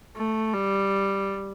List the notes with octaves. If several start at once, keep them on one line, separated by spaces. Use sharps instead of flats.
A3
G3